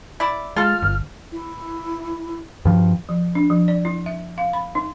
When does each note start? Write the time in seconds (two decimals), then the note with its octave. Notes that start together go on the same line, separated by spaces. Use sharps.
0.20 E4 D5
0.56 G#3 F4 A4 F6
0.82 G1
1.32 E4
2.65 G2 F3
3.09 F3
3.35 D4
3.50 F3
3.68 D5
3.85 E4
4.06 E5
4.38 F5
4.53 B5
4.75 D#4